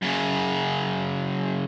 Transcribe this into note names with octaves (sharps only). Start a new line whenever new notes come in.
F#2 C#3